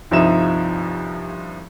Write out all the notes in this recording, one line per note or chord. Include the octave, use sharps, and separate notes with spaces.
C2 G2 F3 D#4 E5 E7